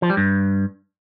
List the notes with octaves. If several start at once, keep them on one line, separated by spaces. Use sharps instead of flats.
F3
G3
G2